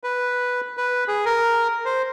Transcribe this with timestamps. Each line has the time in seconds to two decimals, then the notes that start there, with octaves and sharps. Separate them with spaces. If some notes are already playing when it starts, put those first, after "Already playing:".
0.04 B4
0.77 B4
1.08 G#4
1.26 A#4
1.85 C5